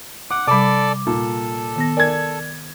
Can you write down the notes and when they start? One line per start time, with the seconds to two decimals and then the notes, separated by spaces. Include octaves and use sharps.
0.31 F#5 D6
0.47 C3 G3 A4 D5 B5 D6
1.07 A#2 A4
1.76 D#3 B3 A#6
1.97 A#4 D5 G#5 G#6